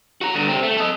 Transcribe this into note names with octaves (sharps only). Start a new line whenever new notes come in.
F#4 A#5
G2 D3
C3 C4
A3
A4 D#5